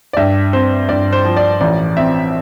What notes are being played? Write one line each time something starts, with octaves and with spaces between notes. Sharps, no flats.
D5
G2 E5
C4 C5
G2 D5
C5
F3
D5
A1 D5
C4 E5